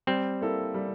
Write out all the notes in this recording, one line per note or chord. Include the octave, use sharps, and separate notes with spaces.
G3 C4
A#3 E4 A4
G3